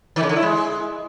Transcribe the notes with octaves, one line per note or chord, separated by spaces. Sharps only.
D#3
C#3
D3
E4
G#3